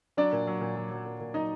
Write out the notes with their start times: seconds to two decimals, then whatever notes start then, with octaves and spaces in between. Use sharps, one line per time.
0.17 F#3 D4 D5
0.32 A#2
0.47 F#3
0.61 A#2
0.76 F#3
0.91 F#3
1.05 A#2
1.20 A#2
1.34 F#3 D#4 D#5